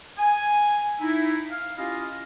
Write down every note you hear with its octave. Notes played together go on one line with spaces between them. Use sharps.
G#5
D#4 E4
F5
C#4 E4 F4 G4 D#5 F5